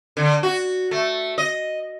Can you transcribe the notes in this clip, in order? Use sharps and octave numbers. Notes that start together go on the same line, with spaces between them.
D3
F#4
A3
D#5